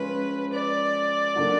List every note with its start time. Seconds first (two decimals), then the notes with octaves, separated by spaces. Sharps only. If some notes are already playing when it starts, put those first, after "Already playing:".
Already playing: F3 G#3 C#4 F4 B4
0.54 D5
1.35 D3 F#3 A#3 D4 F#4